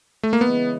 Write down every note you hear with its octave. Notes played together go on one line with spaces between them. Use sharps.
A3
A#3
C#3 E3 G#3 B3